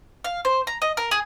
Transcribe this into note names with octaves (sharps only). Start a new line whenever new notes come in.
F5
C5
A#5
D#5
A#4
G#4